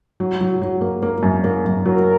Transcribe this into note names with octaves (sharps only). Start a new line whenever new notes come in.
F#3
F#3
F#3
A#3
A#3
F#2
A#3
F#2
F#3 A#4